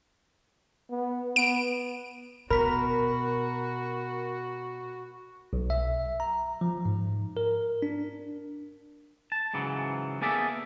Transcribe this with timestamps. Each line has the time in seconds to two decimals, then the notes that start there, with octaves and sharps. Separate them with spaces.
0.91 B3
1.36 B3 D7
2.50 B2 F#4 A#4 B5 B6
5.53 B1
5.70 E5
6.20 A#5
6.61 F3
6.85 G#2
7.37 A#4
7.82 D4
9.32 A5
9.54 G#2 C#3 E3 F#3
10.21 A#3 B3 G#4 A4 D5 E5